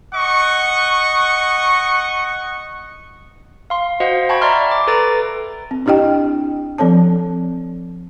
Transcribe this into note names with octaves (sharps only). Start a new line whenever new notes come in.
D#5 F#5 C#6
F5 C6
F#4 C5 D#5 F5 F#5
G5 A5 B5 C#6 G#6
D5 E5 A#5 C6 F6
D6
A4 B4 A#5 A6 D7
C4
D4 E4 G4 D#5 G5
F3 C4 A4 C#5 A5